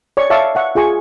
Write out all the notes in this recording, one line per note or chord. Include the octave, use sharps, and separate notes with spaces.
C#5 D5 C#6
C#5 E5 F5 A5 C#6 D6
E5 F#5 C#6
F4 G#4 G#5 C#6